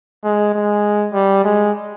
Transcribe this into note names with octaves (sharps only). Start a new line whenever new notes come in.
G#3
G#3
G3
G#3